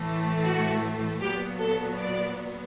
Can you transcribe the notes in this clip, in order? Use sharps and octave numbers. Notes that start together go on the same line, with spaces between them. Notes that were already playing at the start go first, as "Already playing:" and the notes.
Already playing: A2 E3 A3
F#4
A#2 F#3 B3 G4
A4
D5